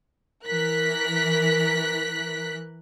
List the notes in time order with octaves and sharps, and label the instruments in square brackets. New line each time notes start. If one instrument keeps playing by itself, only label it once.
[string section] E3 A#4 F#6 B6